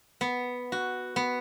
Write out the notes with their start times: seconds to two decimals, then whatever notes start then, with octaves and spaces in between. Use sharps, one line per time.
0.21 B3
0.72 F#4
1.16 B3